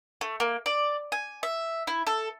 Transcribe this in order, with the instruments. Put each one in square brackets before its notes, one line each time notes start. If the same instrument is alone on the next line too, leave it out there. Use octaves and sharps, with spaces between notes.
[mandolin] A3
A#3
D5
G#5
E5
E4
A4